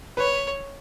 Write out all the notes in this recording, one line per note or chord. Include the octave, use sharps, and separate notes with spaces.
B4 C#5